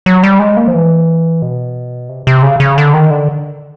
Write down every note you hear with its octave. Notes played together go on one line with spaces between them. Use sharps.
F#3
G3
G#3
A#3
F3
E3
B2
C3
C3
C#3
C#3
D3
D#3
D3